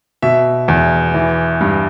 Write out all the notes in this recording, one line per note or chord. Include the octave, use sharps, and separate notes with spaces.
B2 E5
E2
E3
G2